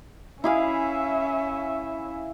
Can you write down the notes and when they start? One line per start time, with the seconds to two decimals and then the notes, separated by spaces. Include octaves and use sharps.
0.44 C#4 E4 G#4 E5 F5